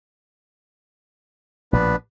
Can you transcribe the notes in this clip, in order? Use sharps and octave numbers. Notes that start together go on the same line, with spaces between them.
A#1 A2 F3 B3 D4 B4